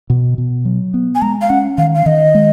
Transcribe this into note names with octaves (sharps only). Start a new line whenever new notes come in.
B2
B2
F#3
B3
G#5
G#3 A#5
F5
C#4 F#5
D#3 F5
F5
D#3 D#5
G#3